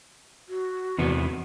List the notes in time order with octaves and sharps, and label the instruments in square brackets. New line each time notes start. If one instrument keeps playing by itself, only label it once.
[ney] F#4
[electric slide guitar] E2 C3 B3